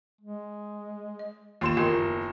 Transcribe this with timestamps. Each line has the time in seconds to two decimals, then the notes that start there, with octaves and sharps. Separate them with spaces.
0.21 G#3
1.19 D#5
1.61 D#2 F4 C6 E7
1.77 F#1 B3 F4 A#4 D#5